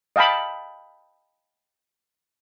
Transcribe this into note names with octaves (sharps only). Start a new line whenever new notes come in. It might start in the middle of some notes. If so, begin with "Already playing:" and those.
D#5 F5 G5 A5 B5